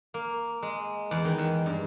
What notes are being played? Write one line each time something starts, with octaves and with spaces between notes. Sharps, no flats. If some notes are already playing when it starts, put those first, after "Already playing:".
A#3
G#3
E2
D#3
E2
G2